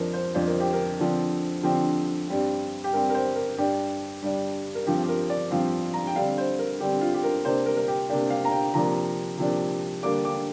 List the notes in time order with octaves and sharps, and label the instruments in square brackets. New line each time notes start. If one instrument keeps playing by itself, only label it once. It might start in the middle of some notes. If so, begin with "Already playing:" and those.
Already playing: [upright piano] F2 F3 D4 A#4 C5
C5
F2 F3 D4 C5
A#4
G4
A#4
D3 F3 C4
D3 F3 C4 G4
G2 G3 C4
G4
G2 G3 C4 A#4
A#4
C5
A#4
G2 G3 D4 G4
G2 G3 D4
A#4
G2 F3 C4 G4
G4
A#4
D5
G2 F3 C4 F5
A#5
G5
D3 G3 C4 F5
C5
A#4
D3 G3 C4 G4
F4
G4
A#4
C3 A#3 D4 C5
A#4
A#4
G4
C3 A#3 D4 G4
F5
A#5
G5
C3 F3 A#3 D4 A#5
C3 F3 A#3 D4
D3 G3 A#3 D4 D6
D6